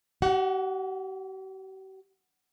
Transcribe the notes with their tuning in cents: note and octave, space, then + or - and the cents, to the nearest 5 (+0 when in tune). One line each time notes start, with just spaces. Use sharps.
G4 -45 F#5 +0